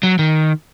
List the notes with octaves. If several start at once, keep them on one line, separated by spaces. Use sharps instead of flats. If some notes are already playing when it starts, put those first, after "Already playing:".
F#3
D#3